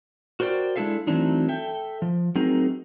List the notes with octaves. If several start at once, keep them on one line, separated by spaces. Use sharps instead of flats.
F#4 A#4 C5 D5 G5
G#3 D4 E4 A4 E5 F5
E3 F#3 A3 C4 D4 D#4
A4 E5 G5
F3
F#3 A3 C4 D#4 G#4 A#4